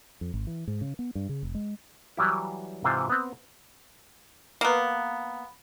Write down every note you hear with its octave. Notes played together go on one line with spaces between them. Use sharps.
F2
G#1
E3
G#2
C#3
B3
G2
C#3
F1
G#3
E3 F#3 G3 E4
G#2 C3 E3 F4 C5
B3 C4
A#3 B3